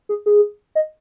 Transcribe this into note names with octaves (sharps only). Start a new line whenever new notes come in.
G#4
G#4
D#5